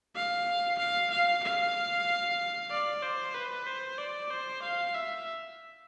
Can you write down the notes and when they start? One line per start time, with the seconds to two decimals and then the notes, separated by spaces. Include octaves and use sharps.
0.16 F5
0.79 F5
1.11 F5
1.44 F5
2.71 D5
3.02 C5
3.34 B4
3.66 C5
3.98 D5
4.30 C5
4.62 F5
4.94 E5